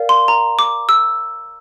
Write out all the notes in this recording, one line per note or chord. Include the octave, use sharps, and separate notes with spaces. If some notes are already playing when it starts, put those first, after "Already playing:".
Already playing: A#4 D5 F5
C6
A#5
D6
E6